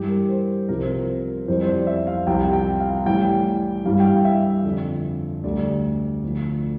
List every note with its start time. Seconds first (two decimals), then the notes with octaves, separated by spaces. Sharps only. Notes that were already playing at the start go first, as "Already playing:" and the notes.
Already playing: G2 E3 G3 G4
0.09 A#4
0.29 C5
0.69 C2 C3 F3 A#4
0.81 C5
0.92 A#4
1.48 F2 E3 G3 C5
1.63 C5
1.67 D5
1.87 E5
2.07 F5
2.27 C2 C3 F3 G5
2.53 G5
2.80 F5
3.06 A2 E3 G3 G5
3.85 G2 E3 G3 F5
4.00 G5
4.05 F5
4.25 E5
4.64 F2 D3 F3
5.44 D2 D3 G3 D5
6.23 D2 D3 F3